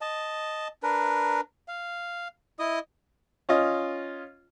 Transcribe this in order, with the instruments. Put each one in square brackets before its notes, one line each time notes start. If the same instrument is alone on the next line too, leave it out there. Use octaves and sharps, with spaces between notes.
[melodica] D#5 A5
D4 A#4 B4
F5
E4 D#5 D#6
[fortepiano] C#4 F4 D#5